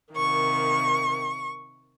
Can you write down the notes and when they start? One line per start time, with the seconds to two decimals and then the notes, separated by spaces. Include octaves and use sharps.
0.15 C3 D#3 A#3 C#6